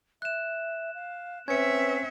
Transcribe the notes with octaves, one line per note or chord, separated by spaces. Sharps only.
E5 F#6 E7
F5
C4 C#4 B4 E5 G#6 C#7